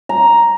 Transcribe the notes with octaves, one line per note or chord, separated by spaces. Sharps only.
A#5